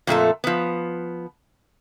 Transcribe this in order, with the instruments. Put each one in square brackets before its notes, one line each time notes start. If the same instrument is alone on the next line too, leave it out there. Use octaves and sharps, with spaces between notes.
[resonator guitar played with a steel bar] F2 A#2 A3 A4
F3 B3